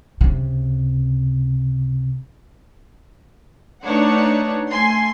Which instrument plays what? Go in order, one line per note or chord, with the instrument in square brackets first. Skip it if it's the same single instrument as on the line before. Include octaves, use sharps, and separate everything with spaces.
[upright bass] C#2 C3
[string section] A3 D4 D#4 B4 C#5 F#5
A3 G#5 C6